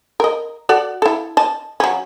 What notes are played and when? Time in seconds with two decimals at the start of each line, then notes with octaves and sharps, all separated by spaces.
0.20 A#4 D#5
0.69 F#4 A4 D5
1.02 E4 A4
1.37 D#5 A5
1.80 F#3 C#4